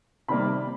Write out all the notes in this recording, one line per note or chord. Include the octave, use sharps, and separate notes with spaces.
C3 D#3 G3 A#3 B5